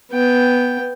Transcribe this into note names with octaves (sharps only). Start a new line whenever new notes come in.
B3 G5